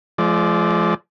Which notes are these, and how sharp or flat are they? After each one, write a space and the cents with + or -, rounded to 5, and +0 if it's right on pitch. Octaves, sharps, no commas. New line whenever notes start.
F3 -15 G#3 +40 D5 +0